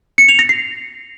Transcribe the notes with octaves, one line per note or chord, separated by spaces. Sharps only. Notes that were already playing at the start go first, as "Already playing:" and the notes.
C#7
F7
A#6
C7